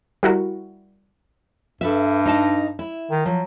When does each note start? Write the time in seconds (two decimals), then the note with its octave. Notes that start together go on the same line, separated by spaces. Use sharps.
0.23 G3 E4 F#4 A#4
1.81 G2 A4 B4 E5
2.26 D#4 D#5 A5
2.79 E4
3.11 D#3
3.26 F3 F#3